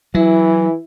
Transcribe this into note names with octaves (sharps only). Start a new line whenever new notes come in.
E3 F#3 E4